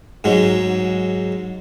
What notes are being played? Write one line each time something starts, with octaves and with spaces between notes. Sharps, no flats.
G#2 F#3 G#3